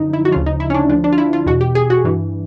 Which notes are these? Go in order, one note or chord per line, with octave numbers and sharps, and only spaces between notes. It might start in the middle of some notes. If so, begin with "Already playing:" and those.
Already playing: F#2 D3 F3 D#4
E4
F#4
D2 C#3 F3 F4
D#4
E4
C#4
D4
D2 D3 F3 D4
D4
F4
E4
F4
E2 B2 F#4
G4
G#4
F#4
G2 E3